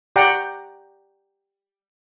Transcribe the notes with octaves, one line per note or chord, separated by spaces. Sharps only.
G4 D5 F#5 G5 A#5